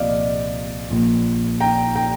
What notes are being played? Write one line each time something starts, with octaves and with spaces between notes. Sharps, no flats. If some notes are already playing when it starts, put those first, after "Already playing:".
Already playing: C2 A#2 F3 D5 D#5 F5
A#1 A#2 F3
G5 A#5
G5 A#5